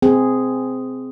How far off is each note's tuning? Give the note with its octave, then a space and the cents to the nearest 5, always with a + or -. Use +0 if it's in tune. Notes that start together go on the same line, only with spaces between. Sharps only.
C4 -20 G#4 +0